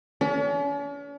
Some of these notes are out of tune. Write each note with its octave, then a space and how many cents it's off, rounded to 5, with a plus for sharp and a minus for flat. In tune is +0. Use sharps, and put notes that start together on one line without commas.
C#4 +45